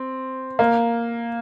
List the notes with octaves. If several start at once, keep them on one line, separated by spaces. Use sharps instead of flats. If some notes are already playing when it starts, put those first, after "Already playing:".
Already playing: C4
A#3